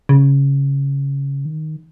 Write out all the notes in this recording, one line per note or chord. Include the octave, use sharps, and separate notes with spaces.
C#3
D#3